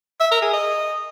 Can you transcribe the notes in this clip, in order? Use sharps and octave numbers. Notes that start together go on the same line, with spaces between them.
E5
A#4
G#4
D#5